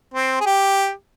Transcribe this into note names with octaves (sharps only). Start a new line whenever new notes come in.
C4
G#4
G4